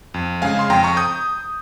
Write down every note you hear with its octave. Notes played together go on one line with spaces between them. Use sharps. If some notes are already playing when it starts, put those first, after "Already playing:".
F2
C#3 G#3 F5 G#5
C6
F2 G5 A#5
A#5 C#6
D#6 G6